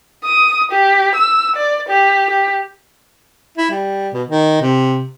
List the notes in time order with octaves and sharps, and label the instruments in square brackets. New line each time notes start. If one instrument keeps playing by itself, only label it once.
[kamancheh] D#6
G4
E6
D5
G4
G4
[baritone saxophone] E4
G3
B2
D#3
C3